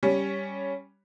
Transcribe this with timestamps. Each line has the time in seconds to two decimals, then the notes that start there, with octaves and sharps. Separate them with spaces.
0.03 G3 C#4